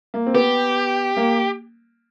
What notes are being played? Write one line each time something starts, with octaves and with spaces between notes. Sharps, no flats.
A#3
C4
B3 G4
A#3